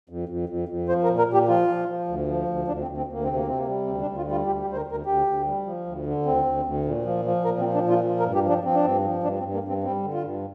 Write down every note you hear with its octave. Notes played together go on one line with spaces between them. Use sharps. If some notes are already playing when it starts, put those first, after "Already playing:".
F2
F2
F2
F2
F3 C5
A#4
A#2
A#4
A#2 G4
F3 F4
F3
F3
D2
F3
D2
D2 D4
C4
D2
C4
D2
A#3
C3 C4
A#3
C3 C4
A#3
G3
D2 C4
D4
D2
F4
G3 F4
D2 G4
G4
D2
C5
A#4
D2 A#4
D2 G4
D2
G3
F3
D2
D3
D2 C4
D2
D2
A#2
F3
F3
A#2 A#4
C4
F3
D4
A#2 F4
F3
A#4
G2
G4
F3
D4
F3 C4
D4
G2 C4
F3
G2 D4
C4
G2
A#3
G2 C4
G3 C4
D3
F4
G2